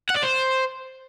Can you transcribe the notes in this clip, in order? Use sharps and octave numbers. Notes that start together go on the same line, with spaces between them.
F#5
D5
C5